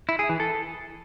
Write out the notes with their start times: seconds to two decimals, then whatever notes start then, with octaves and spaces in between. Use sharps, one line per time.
0.09 E4
0.19 G#4
0.29 E3
0.40 A4